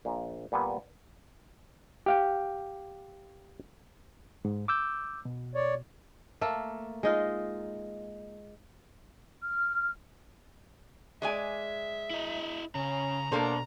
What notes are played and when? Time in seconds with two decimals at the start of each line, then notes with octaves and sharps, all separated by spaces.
0.05 A#1 A#2
0.52 A#2 G3 B3 G#5
2.06 G4 F5 G5
4.45 G#2
4.68 D6 E6 G6
5.25 B2
5.55 C#5 D5
6.41 A3 A#3 A4
7.03 G#3 D#4 F4
9.43 F6
11.22 G#3 D5 E5 G#5
12.10 E4 D#5
12.75 C#3 C#4 A#5
13.32 B2 A#3 D4 A4 C5